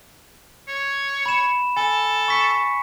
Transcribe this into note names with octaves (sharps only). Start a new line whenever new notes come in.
C#5
B5 E7
A4 G#5
C#6 B6 C#7